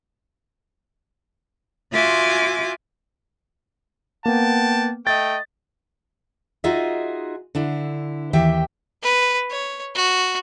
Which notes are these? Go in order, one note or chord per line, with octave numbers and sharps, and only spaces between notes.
F4 F#4 E5 G#5 C6 D6
A#3 B3 F#5 G5 A5
A3 D#5 G5 A6
D#4 F4 F#4 G#4 D#5 E5
D3 D4 E4
D#2 E3 G4 E5 G5
B4
C#5
F#4